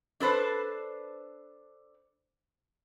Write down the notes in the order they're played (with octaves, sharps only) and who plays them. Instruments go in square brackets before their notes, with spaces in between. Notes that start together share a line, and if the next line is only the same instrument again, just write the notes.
[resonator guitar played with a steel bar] D4 A4 B4 C5